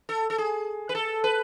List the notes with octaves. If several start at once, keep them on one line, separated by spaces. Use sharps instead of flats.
A4
A4
G#4
B4
A4
B4